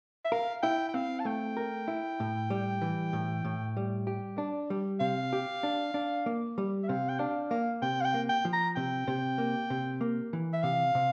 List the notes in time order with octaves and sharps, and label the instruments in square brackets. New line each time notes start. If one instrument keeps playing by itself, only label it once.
[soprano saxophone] E5
[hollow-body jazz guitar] A#4 [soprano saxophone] F5
[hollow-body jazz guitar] E4 [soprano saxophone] G5
[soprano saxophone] G5
[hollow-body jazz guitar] C4 [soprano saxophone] F5
[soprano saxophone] A5
[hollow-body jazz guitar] A3 [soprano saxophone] G5
[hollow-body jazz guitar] A#4
E4
A2
G3
E3
A2
A2
G3
G4
D4
G3
[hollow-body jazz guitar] C3 [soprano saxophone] F5
[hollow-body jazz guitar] G4
D4
D4
A#3
G3
[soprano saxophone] E5
[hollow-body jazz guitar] C3 [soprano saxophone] F5
[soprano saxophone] G5
[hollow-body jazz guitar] D4 [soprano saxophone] F5
[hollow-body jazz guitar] A#3 [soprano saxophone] F5
[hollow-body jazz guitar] C3 [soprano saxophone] G5
[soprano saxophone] F5
G5
[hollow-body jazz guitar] A#3
[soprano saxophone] G5
[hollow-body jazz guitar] F3
[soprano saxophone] A#5
[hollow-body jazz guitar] C3 [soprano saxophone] G5
[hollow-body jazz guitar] C3
A#3
C3
A#3
E3
[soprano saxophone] E5
[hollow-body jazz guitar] C3 [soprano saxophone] F5
[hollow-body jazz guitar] C3